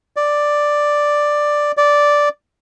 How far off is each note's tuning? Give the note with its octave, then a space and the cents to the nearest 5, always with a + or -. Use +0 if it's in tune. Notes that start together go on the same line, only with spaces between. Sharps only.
D5 +5
D5 -5